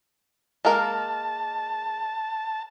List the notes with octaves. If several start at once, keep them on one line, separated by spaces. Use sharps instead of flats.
G#3 A#3 A#4 A5